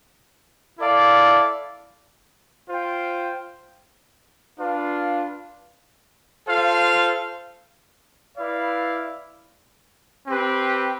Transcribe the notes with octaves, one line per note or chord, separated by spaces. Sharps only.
E4 A4 D5 F5
F4 C5 G5
D4 F4 B4 F5
F4 A4 C5 F5
E4 B4 D5 F5
C4 G4 B4